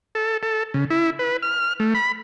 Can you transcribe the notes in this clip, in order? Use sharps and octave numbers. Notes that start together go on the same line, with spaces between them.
A4
A4
C#3
E4
B4
F6
A3
B5